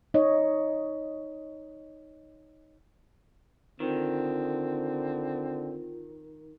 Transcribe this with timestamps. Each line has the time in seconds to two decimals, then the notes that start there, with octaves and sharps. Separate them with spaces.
0.14 D#4 C#5 D#5
3.80 D3 D#3 C4 F4